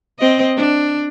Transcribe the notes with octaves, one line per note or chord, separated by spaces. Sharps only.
C4 D#5
D4